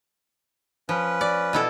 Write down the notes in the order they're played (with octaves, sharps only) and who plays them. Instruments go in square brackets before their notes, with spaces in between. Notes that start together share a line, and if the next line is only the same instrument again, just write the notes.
[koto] F3 [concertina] C#4 B4
[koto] D5
B2 E4 A4